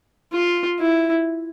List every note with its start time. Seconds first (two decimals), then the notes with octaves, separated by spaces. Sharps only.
0.33 F4
0.79 E4